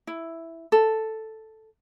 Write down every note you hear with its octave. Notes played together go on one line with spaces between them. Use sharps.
E4
A4